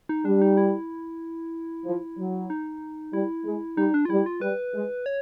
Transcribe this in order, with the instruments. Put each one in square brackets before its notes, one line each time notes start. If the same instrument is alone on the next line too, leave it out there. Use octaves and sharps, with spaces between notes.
[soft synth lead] D#4
[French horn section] G3 [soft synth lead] D4
[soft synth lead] D#4
E4
[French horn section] F3
F#3
[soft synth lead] D#4
[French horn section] G3 [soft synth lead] E4
[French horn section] G#3
[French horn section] G3 [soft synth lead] D#4
[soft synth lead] D4
F4
[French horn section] G3 [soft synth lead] E4
[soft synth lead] F4
[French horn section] G3 [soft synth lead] B4
[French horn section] G#3
[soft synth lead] C#5